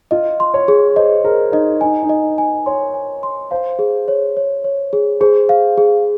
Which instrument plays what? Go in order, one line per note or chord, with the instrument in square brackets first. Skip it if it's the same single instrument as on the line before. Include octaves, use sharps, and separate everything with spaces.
[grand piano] F4 [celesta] D#5
[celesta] C6
[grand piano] C#5
[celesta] G#4
[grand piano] C5 [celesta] D#5
[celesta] G#4 [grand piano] A#4
[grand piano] D#4 [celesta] D#5
[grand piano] D#4 [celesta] G#5
[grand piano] D#4
[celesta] D#5
G#5
[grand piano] C#5 [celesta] C6
[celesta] G#5
C6
[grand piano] C5 [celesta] F5
[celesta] G#4
C#5
C#5
C#5
G#4
[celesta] G#4 [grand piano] C5
[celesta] F5
G#4